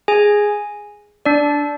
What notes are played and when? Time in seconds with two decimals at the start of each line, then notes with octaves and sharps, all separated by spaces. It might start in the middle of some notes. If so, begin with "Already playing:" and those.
0.08 G#4 G#5
1.25 D4 D5